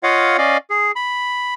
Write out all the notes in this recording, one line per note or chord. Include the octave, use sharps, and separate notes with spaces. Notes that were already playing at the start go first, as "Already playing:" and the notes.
F4 C#5 D#5 F5 F#5
C#4 D5 D#5 F5
G#4
B5